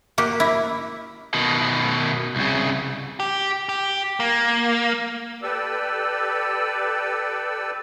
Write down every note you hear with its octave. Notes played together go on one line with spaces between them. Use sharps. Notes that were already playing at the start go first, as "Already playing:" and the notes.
A#3 F#4 G4
E4
B2 D#3
C2 C#3
G4
G4
A#3
G4 A4 B4 D5 E6